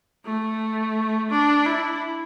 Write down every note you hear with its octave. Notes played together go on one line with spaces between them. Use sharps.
A3
D4
E4